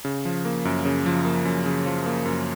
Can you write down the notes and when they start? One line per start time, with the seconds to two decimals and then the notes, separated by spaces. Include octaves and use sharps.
0.05 C#3
0.25 F3
0.45 A#3
0.65 F#2
0.85 C#3
1.06 F3
1.25 A#3
1.45 F#2
1.66 C#3
1.86 F3
2.06 A#3
2.25 F#2